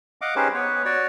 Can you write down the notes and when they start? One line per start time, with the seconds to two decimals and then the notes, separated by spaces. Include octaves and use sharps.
0.21 D#5 F5 F#5 D6
0.36 C#4 D#4 G4 G#4 B4 C5
0.54 B3 B4 C#5
0.85 F#4 C#5 D5